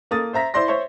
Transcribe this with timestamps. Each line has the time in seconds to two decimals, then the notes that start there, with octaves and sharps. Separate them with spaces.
0.11 A#3 A4 D#6 A6
0.33 C5 E5 A#5 A#6 B6
0.54 E4 C5 D5 C6 A#6
0.68 C5 C#5 E5 C#6